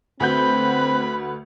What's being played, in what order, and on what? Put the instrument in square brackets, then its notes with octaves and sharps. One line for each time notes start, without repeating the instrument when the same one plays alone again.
[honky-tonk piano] D2 F#4 G6 [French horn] C4 [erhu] B4 [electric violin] B5